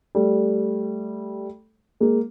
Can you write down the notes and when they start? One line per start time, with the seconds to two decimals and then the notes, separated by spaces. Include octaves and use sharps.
0.15 G3 A3
2.00 G#3 A#3